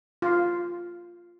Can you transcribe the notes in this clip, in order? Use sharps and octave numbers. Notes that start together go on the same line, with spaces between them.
F4